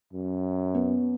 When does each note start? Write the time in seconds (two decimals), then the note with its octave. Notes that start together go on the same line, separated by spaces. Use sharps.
0.13 F#2
0.74 B3